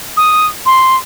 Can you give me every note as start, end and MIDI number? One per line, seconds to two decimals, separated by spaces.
0.17 0.47 87
0.66 0.96 84